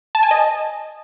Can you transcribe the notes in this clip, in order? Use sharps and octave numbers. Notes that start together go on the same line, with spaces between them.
A5
G#5
D#5